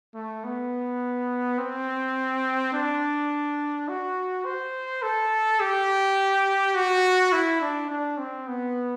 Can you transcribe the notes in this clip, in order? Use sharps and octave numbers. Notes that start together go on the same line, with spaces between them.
A3
B3
C4
D4
F#4
C5
A4
G4
F#4
E4
D4
D4
C4
B3